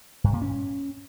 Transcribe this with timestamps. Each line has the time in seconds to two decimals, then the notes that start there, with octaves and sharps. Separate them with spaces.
0.24 G2
0.33 A#2
0.42 C#4